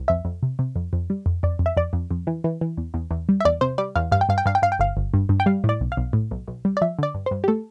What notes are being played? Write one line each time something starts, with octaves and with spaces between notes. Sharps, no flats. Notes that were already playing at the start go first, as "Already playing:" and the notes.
Already playing: C2
F2 E5
F2
C3
C3
F2
F2
G3
F2
F2 D5
F2
E5
F2 D5
F2
F2
E3
E3
E3
E2
E2
E2
G3
E5
E2 D5
C3 C5
G3 D5
E2 F5
G2 F5
G5
G2 F5
G5
G2 F5
G5
G2 F5
G5
G1 F5
G1
G2
G2
G5
G3 F5
A2
D5
B1
F5
B1
A2
B1
B1
G3
D5
F3 E5
D3 D5
G2
G2 C5
G4
A3 A4